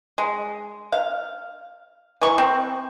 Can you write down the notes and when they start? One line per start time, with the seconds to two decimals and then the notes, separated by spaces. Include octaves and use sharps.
0.18 G#3
0.92 F5
2.21 E3 C#6
2.38 C4